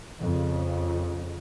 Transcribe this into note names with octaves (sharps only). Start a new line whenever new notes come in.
F2 C#3